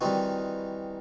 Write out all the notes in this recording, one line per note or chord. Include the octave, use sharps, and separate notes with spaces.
D#3 E3 G3 C4 D#4 F#4